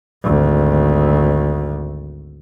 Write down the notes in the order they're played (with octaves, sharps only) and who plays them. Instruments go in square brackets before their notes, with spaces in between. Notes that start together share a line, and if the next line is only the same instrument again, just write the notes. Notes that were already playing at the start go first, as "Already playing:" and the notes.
[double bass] G#1 D2